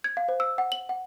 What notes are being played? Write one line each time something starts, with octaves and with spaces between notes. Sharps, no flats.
G#6
F5
C5
E6
F#5
F#7
F#5